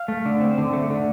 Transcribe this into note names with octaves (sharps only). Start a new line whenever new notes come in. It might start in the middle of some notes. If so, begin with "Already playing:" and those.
Already playing: F5
A3
D3
C4
D3
A3
D3